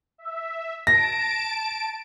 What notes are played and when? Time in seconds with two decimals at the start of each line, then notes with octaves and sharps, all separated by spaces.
0.18 E5
0.87 A5 A#6 D7